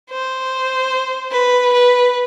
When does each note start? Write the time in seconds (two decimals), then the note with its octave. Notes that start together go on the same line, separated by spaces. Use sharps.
0.11 C5
1.31 B4
1.73 B4